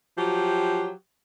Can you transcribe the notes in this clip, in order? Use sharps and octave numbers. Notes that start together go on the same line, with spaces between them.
F3 F#3 G4